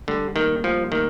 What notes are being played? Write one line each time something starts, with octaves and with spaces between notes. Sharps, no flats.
D3 G3
D#3 A#3
F3 G3
D#3 A#3